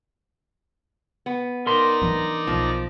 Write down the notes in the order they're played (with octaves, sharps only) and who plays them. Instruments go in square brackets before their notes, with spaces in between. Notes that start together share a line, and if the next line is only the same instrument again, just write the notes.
[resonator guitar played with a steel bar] B3
[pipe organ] D#4 D5 A#5 [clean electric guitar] A#4 C6
[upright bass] E3 D4
[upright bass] B1 [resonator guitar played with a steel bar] F3